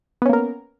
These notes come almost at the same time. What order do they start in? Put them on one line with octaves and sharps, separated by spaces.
B3 C#4 A#3 A#4